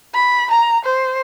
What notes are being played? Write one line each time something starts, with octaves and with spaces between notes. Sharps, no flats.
B5
A#5
C5